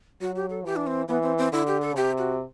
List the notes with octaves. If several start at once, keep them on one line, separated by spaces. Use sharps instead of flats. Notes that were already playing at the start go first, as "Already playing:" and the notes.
F#3 F#4
G4
A4
E3 G4
D4
C4
E3 B3
C4
C4
D3 E4
G4
A4
C3 G4
F#4